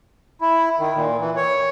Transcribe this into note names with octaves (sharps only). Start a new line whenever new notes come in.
E4
D#3
A#2
E3
C#5